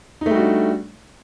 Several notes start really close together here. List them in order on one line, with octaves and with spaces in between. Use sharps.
D#4 A3 G3 F#4 D4